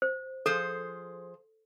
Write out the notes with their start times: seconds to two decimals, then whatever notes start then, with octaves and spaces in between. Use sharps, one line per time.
0.02 C5
0.46 F3 G#4 A4 C5